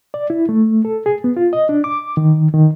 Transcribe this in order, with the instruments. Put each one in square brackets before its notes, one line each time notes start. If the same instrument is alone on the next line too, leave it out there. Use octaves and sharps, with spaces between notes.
[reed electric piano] D5
E4
A3
A4
G#4
B3
F4
D#5
D4
D6
D#3
D#3